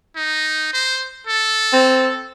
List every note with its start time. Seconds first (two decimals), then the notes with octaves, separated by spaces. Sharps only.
0.16 D#4
0.73 C5
1.27 A4
1.73 C4